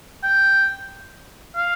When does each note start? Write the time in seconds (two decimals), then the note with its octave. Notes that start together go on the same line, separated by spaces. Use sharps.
0.23 G5
1.56 F5